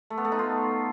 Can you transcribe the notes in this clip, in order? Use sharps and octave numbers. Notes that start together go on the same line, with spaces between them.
A3
B3
A3
D#4
F4